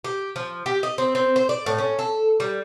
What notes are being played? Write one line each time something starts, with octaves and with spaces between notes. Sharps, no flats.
G4
F3
G4
D#5
C4
C4
C5
D5
A2
C#4
A4
G3